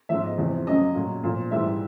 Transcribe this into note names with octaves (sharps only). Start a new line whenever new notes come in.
G#2 F3 E5
D#5
E2 C3 F3
F#2 C#3 F#3 D#5
A#2 F#3
A#2 F3
G#2 E3 G3 E5